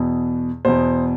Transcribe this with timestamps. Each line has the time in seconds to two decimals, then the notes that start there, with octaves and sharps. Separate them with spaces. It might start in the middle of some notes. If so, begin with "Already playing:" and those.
Already playing: E2 B2
0.65 E2 B2 C5